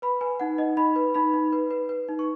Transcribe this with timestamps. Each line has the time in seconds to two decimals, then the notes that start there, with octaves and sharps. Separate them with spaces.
0.02 B4 B5
0.21 B4 G#5
0.40 D#4 F#5
0.58 D#4 D#5
0.77 D#4 B5
0.96 B4
1.14 D#4 B5
1.34 D#4
1.52 B4
1.70 B4
1.89 B4
2.08 D#4
2.19 C#6